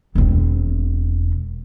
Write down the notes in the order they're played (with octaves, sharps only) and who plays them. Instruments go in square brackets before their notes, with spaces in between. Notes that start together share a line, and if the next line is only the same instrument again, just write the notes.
[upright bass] E1 C4